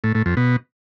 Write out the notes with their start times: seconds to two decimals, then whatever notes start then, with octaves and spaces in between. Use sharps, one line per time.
0.04 A2
0.15 A2
0.26 F2
0.37 B2